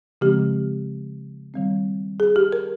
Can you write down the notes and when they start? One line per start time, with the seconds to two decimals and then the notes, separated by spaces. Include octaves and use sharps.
0.21 C#3 F3 G#3 C4 G4
1.54 D#3 G3 C4
2.20 G#4
2.36 G4
2.52 A#4